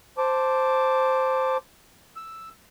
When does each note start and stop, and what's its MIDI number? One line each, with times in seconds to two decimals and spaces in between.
0.18 1.57 72
0.18 1.57 81
0.18 1.57 86
2.16 2.49 88